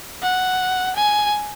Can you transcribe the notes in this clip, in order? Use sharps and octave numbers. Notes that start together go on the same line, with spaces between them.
F#5
G#5